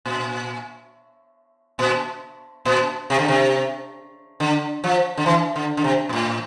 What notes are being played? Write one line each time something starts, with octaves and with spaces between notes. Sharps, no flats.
A#2
A#2
A#2
C3
D3
C3
D3
F3
D3
E3
D3
D3
C3
A#2
A2